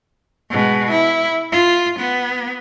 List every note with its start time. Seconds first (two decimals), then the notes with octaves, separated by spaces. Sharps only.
0.51 B2 G#3
0.90 E4
1.52 F4
1.99 B3